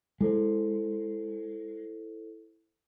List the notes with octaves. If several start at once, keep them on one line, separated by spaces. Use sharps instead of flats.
G#3 E4 A4 C5